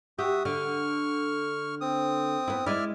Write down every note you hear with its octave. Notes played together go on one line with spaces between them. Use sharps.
F#4 G4 E5 D#6
D3 C#6 F6
C4 D#6
B3 E4
G#3 E4 D5 E5 F6